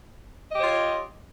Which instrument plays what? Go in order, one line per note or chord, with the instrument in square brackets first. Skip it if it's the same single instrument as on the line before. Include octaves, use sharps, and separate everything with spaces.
[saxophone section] D#5
G4
C#5
F4